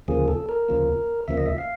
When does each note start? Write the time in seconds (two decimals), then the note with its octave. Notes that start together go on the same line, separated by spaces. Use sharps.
0.08 D2 C#3 F3 A#3 G#4
0.28 A4
0.49 A#4
0.69 D2 C#3 F3 A#3
1.28 D2 C#3 F3 A#3 E5
1.37 D#5
1.46 E5
1.58 F5